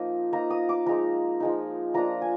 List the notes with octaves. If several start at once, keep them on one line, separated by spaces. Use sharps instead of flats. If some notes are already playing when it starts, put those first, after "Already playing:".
Already playing: F3 A#3 D#4
F3 A#3 D#4 A#5
D#6
D6
F3 G#3 D#4 A#5
F3 G#3 D#4
F3 A#3 D4 F4 A#5
G#5